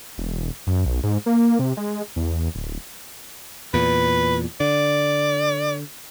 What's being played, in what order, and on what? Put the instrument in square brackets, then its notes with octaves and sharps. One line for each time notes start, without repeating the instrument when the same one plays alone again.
[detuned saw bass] E1
F#2
B1
G#2
A#3
C3
G#3
E2
D1
[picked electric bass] E2 A#2 [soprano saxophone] B4
[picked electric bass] D3 [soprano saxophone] D5